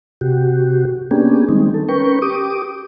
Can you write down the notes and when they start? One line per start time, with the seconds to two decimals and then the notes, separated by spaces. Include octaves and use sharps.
0.21 C3 F#4 G4
1.11 A#3 B3 C#4 D4 G4 G#4
1.49 D#3 G3 G#3 C4 D#4
1.74 A4
1.89 C#4 A#4 B4 G5 C#6
2.22 G4 D6 D#6